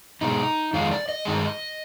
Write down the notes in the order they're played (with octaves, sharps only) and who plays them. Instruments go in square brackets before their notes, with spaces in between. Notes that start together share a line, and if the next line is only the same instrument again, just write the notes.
[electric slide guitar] B2 G#3 D#4
F2 D#3 G#3 F4
D5
D#5
G2 D#3 G#3